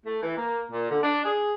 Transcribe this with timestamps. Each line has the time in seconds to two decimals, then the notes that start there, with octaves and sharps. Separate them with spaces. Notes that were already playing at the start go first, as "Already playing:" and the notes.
0.04 A3
0.23 E3
0.37 A#3
0.71 A#2
0.89 D3
1.02 D4
1.24 G#4